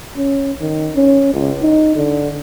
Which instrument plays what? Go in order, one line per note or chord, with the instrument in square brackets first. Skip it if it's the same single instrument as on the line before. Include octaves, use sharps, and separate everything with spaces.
[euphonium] C#4
D#3
C#4
C#2
D#4
D3